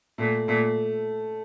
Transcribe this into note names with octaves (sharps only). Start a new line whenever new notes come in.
A#2 A3
A#2 A3